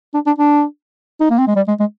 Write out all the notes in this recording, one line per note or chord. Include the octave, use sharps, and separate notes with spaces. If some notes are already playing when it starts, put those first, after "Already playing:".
D4
D4
D4
D#4
A#3
C4
G#3
G3
G#3
G#3